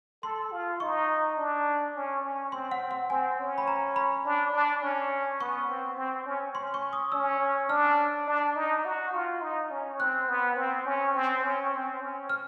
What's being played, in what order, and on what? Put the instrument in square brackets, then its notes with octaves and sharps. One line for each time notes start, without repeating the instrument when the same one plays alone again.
[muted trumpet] A4 [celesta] C6
[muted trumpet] F4
[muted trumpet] D#4 [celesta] C#6
[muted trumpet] D4
C#4
C#4
[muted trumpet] C4 [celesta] C6
[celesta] F#5
[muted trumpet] C4
[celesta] F#5
[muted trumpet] C4 [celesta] G#5
[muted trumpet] C#4
[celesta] B5
A#5
B5
[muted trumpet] D4
D4
C#4
[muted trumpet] B3 [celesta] C#6
[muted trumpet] C4
C4
C#4
[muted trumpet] C#4 [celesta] C6
[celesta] C#6
D#6
[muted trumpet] C#4 [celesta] E6
[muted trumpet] D4 [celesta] F6
[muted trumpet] D4
D#4
F#4
F4
D#4
C#4
[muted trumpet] C4 [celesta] F#6
[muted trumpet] B3
C4
C#4
C4
C#4
C4
C#4
[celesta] F6